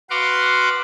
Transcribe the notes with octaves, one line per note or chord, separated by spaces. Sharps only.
F#4 B4 F5 F#5 C6 D6